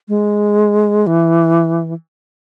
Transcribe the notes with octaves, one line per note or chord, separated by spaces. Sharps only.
G#3
E3